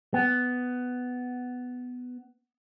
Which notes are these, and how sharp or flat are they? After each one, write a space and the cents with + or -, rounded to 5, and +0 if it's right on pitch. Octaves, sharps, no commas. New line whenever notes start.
B3 +10